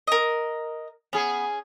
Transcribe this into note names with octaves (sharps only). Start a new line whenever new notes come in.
A#4 D#5
B3 C#4 G#4